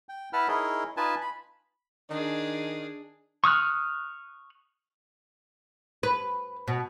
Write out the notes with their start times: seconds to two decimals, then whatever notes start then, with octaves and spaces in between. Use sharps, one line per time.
0.09 G5
0.33 E4 B4 F#5 A5 B5 F6
0.48 D#4 E4 G#4 A#4 C#5 D#5
0.97 D#4 F4 B4 G#5 A5
1.21 B5
2.10 D#3 D4 G#4
3.44 C#6 D#6 F6 F#6
6.03 B4
6.68 B2